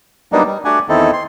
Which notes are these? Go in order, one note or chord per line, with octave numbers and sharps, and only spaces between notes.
F#3 G3 A#3 B3 D4 D#4
G3
A3 D4 F#4 G4 F#5 G#5
E2 D#3 C4 D#4 E4 A4
C6